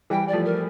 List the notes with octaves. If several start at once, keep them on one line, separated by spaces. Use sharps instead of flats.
E3 G3 G5
D5
F3 A3
A#4